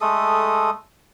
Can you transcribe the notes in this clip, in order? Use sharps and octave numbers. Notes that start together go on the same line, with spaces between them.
G#3 A3 A4 D#6